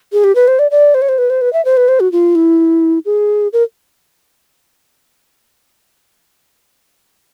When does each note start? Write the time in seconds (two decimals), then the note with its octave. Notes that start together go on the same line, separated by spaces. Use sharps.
0.13 G#4
0.24 G4
0.35 B4
0.48 C5
0.59 D5
0.71 D5
0.94 C5
1.02 C#5
1.09 C5
1.18 B4
1.30 C5
1.41 B4
1.53 E5
1.65 C5
1.77 B4
1.88 C5
2.00 F#4
2.12 F4
2.35 E4
3.06 G#4
3.53 A#4